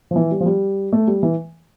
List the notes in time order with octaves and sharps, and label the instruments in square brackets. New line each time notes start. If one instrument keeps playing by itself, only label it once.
[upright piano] F3
E3
G3
F3
G3
A3
G3
E3